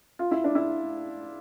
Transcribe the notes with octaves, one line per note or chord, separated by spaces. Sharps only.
F4
E4
D4
E4